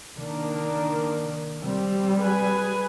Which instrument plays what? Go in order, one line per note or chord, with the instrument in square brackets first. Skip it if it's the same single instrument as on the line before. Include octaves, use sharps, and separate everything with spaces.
[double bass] D#3 [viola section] A#3 D4 A#4
[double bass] G3 [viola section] C4
[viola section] G#4 B4 G#5